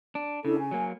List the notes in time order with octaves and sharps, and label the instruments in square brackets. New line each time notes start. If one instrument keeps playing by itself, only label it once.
[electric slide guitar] D4
[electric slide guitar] C#3 [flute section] D4 E4 A4
[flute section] G#5
[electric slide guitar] F#3 A#3